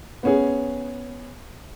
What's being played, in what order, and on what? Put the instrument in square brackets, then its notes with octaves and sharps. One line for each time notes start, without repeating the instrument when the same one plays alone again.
[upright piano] B3 C#4 G#4